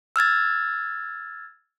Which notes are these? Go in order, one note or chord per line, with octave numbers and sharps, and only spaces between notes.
E6 F6 G#6 A6